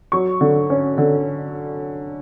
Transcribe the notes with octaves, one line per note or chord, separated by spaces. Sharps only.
F#3 C#6
D3
C#4
D3